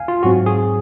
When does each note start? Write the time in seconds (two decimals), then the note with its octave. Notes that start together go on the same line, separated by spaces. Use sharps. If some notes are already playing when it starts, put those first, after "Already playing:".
Already playing: F5 G#5
0.08 F4
0.23 G#2 F#3 C4 F#4
0.46 G#4